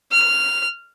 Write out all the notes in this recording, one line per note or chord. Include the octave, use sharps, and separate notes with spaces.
F6